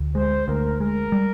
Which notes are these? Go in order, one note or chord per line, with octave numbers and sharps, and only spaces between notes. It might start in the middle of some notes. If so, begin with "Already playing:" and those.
Already playing: D2
G#3 C5
D2 A#4
G#3 A#4
G3